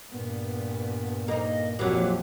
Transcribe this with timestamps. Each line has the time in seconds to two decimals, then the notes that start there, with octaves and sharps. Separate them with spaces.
0.12 G2 A#2 B3
1.28 A#3 D#4 D#5
1.79 A#1 F2 A#2 F#3 G4